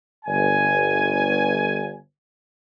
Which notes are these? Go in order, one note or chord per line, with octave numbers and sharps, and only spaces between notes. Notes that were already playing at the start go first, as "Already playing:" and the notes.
G1 G#5